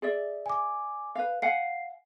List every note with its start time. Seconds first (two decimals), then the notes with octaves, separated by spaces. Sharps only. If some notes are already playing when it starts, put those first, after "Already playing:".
0.02 G#4 D5 E5
0.46 G#5 D6
1.15 B4 F5
1.42 F5 F#5 G#5 C7